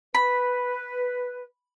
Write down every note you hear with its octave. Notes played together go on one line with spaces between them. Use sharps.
B4 B5